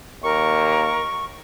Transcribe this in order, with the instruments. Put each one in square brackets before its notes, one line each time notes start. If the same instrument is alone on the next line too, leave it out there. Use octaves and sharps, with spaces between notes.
[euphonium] D#2 [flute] A#4 [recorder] C#6